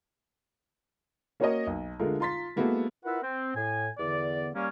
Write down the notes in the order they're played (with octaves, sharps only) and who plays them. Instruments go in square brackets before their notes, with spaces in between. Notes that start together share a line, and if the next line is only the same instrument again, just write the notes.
[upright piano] A#3 C#4 F#4 A#4 C#5 D#5
B1
D3 G#3 A3 F4 A#4
F4 A#5 C6 A6 B6
G#3 A#3 B3 E4 F#4 A4
[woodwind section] E4 F4 A#4 B4 E5 F#5
C4
A2 G#5
E2 D3 B3 D5
G3 A#3 C#4